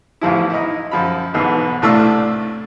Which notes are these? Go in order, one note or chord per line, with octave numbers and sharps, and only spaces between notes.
A1 E2 F3 E4
D#4 E4
F#2 F3 B5
B1 E2 G#2 B2
C2 A2 A3 D4 F5 E6